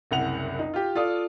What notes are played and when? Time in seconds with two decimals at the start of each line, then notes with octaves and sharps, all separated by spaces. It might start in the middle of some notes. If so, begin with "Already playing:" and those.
0.11 F#1 C2 F#5 F7
0.59 D#4
0.74 F4 G4
0.95 F4 A4 D5 F5 D#6